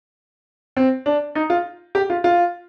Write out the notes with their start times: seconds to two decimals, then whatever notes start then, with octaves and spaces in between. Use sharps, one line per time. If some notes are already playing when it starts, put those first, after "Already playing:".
0.77 C4
1.06 D4
1.35 D#4
1.50 F4
1.95 G4
2.10 F4
2.24 F4